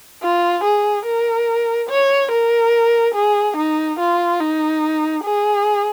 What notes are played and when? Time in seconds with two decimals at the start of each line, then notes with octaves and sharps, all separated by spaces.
0.22 F4
0.64 G#4
1.06 A#4
1.89 C#5
2.32 A#4
3.15 G#4
3.57 D#4
4.00 F4
4.40 D#4
5.24 G#4